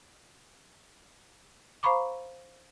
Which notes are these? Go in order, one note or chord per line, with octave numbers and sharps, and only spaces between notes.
C5 F5 A#5 B5 C#6 D6